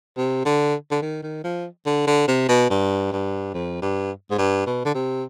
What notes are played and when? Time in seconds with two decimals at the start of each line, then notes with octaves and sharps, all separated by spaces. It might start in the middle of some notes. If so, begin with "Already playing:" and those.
0.17 C3
0.45 D3
0.91 D3
1.02 D#3
1.23 D#3
1.44 F3
1.86 D3
2.07 D3
2.28 C3
2.49 B2
2.70 G2
3.12 G2
3.54 F2
3.82 G2
4.31 G#2
4.38 G2
4.66 B2
4.85 D3
4.95 C3